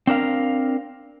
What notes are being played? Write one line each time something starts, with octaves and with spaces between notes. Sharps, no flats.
C4 D4 A#4 F5